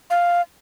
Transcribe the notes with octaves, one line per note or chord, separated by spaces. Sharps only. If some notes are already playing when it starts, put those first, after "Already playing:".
F5